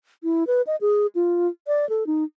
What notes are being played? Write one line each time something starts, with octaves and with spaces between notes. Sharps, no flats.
E4
B4
D#5
G#4
F4
D5
A4
D#4